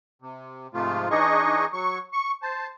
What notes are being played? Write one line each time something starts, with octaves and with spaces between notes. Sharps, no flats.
C3
G#2 C3 F3 A3 F4
E3 D4 D#4 G#4 D#5 C#6
F#3 C#6
C#6
C5 A5